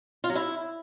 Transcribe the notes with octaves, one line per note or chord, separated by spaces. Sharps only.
F4
F#3
E4